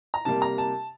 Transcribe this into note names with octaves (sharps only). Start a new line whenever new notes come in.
A#5
C3 G3 A#3 A5
A#5
A5